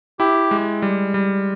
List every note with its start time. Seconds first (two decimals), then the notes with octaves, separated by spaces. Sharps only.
0.19 E4 G4
0.51 G#3
0.82 G3
1.14 G3